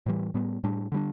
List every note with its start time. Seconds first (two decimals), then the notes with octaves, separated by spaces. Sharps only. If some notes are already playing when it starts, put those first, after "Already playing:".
0.06 A2 E3 G3
0.34 A2 G3 B3
0.64 A2 G3 D4
0.92 D3 G3 D4